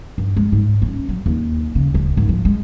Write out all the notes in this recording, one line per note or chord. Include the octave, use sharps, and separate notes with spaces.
G2
G#3
G#2
C#4
F#3
D#2
C#3
D1
G#1
F3
G#3